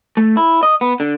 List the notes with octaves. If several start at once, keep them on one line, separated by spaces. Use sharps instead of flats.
A3
E4
D#5
B3
D3